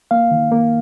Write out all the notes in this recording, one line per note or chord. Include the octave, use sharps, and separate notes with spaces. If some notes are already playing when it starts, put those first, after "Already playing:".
A#3 F5
D#3
A#3